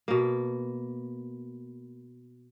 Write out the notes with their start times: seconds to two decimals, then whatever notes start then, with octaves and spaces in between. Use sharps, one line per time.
0.08 B2 A#3